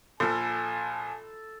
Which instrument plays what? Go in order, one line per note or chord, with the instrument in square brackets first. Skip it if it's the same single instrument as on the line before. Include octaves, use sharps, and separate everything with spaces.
[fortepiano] A#1 F3 [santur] A4 [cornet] G#5